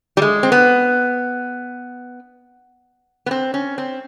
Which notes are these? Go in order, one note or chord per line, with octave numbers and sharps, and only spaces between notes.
G3
G#3
C4
B3
B3
C4
C#4
C4